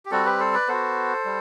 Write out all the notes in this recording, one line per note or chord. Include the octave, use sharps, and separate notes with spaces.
G4
G3 C4 F#4 A4
G4 B4
A4 C5
B4 D5
B3 F#4 A4 C5
G3